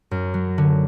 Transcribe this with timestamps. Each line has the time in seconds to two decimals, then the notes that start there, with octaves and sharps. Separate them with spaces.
0.11 F#2
0.34 F#3
0.58 D3